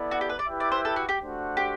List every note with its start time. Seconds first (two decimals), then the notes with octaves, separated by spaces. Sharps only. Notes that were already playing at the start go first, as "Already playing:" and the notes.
Already playing: B3 E4 A4 D5
0.11 F#4
0.21 G4
0.29 B4
0.39 D5
0.48 E4 G4 B4 E5 G5
0.60 D5
0.72 C5
0.85 A4
0.96 F#4
1.09 G4
1.21 A3 D4 F#4 C5 F#5
1.57 G4